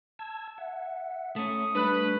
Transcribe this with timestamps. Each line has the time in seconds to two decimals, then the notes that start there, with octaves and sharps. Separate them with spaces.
0.19 A5 E6 G#6
0.58 E5 F#5
1.36 A3 C#4 D#6
1.75 G3 A3 D4 B4